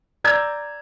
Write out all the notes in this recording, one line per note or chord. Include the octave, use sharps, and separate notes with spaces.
D5 A#5 E6 G6 G#6